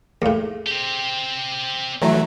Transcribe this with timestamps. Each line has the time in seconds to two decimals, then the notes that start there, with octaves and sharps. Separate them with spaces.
0.22 D#2 A2 G#4 F5
0.66 C4 G4
2.02 E3 F#3 A3 G4 E5 A#5